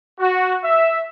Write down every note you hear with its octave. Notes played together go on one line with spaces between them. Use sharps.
F#4
E5